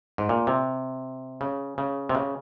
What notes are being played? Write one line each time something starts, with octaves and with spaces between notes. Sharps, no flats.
G#2
A#2
C3
C#3
C#3
C3
C#3